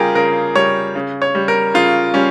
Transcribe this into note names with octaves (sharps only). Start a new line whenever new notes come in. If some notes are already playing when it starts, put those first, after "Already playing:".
Already playing: C#3 G3 F4 G4 G#4 A#4
C#3 A#4
G3 C#5
C#3
C#5
G3
A#4
C#3 F4
G3 C#4